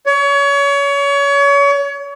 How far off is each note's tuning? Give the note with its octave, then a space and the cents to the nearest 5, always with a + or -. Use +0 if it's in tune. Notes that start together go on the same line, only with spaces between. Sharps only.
C#5 +30